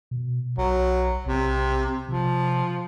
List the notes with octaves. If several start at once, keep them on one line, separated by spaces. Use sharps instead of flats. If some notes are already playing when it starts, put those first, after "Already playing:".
B2
B1 F#3
B1 C3
C3 F3